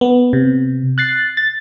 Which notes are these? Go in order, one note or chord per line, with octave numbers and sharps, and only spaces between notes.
B3
C3
F#6 A6 C7
A6